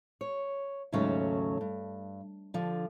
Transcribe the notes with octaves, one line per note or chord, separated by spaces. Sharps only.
C#5
D#2 G#2 C#3 F#3 A3 C#4
G2
D3 F3